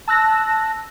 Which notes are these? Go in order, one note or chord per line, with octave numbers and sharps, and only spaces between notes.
A5 E6 F#6 A#6